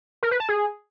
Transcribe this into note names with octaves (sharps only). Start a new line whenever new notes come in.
A#4
B4
A5
G#4